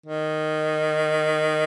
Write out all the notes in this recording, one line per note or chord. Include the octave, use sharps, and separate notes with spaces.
D#3